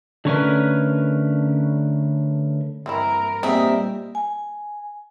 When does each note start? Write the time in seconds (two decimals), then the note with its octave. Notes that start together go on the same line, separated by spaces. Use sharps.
0.25 D3 A3 C#4 F#4 A#4 B4
2.86 G2 E3 C4 E4 A#4
3.43 A#2 G3 B3 C4 D#4 G#4 A#4 E5
4.15 G#5